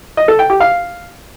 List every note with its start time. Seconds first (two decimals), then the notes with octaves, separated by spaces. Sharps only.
0.17 D#5
0.28 A4
0.39 G5
0.50 G4
0.60 F5